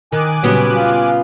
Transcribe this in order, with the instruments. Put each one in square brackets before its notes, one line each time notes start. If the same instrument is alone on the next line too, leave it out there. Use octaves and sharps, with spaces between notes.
[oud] D#3 [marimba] A#4 [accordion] G#5 D6 F#6
[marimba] A#2 C#3 G3 [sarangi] F#3 [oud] B3 C#4 G4
[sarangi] F4